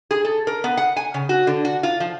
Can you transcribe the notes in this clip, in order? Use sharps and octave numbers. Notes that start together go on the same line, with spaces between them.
G#4
A4
A#4
B3
F#5
G#5
C#3
F#4
D3
F#4
F4
F3